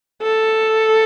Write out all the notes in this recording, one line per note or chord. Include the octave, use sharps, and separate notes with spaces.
A4